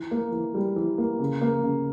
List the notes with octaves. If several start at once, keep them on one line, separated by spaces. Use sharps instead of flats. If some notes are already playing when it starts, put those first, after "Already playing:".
Already playing: E3
A#3
E3
G3
E3
A#3
C#3
A#3
C#3